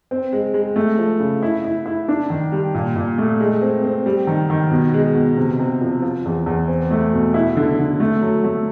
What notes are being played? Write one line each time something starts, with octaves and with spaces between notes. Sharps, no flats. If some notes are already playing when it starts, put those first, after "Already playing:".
C4
G#3
G#3
A3
F3
C#3
E4
E4
E4
D4
D#3
G3
A#2
A#2
A3
G#3
C4
C4
G3
D#3
D#3
B2
G#3
B2
C3
C3
F3
F3
E2
E2
C4
A3
B2
E4
D3
D3
A3
F#3
A3